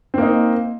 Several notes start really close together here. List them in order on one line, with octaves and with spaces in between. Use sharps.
C4 A#3 D#4